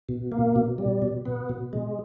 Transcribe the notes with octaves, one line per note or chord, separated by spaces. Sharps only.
B2
A#3
B2
G3
B2
B3
B2
G#3